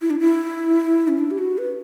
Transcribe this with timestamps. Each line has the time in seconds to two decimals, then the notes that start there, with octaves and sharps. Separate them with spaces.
0.02 E4
0.10 D4
0.19 E4
1.08 C#4
1.19 D4
1.31 G4
1.39 F#4
1.58 B4